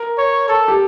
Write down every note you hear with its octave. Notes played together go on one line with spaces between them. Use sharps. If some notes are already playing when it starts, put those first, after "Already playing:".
Already playing: A#4
C#5
A4
G4